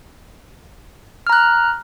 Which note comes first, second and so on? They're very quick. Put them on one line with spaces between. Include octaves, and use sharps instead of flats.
F6 A#5 F#6